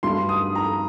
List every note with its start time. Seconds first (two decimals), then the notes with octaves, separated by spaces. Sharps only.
0.03 G2 F#3 A3 C6
0.29 D#6
0.55 A#5